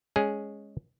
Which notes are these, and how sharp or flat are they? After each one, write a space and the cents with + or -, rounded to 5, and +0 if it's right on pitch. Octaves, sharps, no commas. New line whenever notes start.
G#3 +0 C#4 +0 G#4 +0